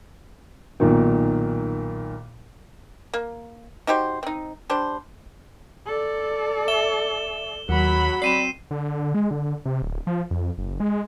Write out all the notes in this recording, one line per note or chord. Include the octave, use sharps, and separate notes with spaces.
B1 A#2 D#3
A#3
D#4 F#4 G4 C5
C4 D#4
G3 D4 C5
A4 D5
E5 E7 G7
D#2 F#3 F#5 B5
C4 D5 C7 D#7 E7
D3
G#3
D3
C3
D1
F3
F2
F#1
G#3